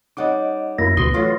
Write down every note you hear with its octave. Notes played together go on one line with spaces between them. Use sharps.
G3 C#4 D#4 D#5 F#5 D6
F#2 A#3 E4 A#6
D2 B2 E3 C6 D#6
E3 F#3 A3 F4